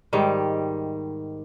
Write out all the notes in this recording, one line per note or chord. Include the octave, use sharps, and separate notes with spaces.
G#2 D#3 G3